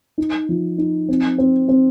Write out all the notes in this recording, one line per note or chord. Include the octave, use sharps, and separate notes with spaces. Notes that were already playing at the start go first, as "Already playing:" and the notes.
D#4
F3
D#4
C4
C4
C4